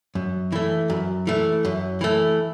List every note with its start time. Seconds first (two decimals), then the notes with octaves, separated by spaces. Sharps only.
0.15 F#2
0.52 E3 A3
0.90 F#2
1.27 E3 A3
1.65 F#2
2.01 E3 A3